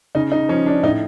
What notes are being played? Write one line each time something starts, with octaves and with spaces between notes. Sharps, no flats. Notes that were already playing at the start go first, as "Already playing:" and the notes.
C#3 D#4
D#4
F3 C#4
D4
A2 D#4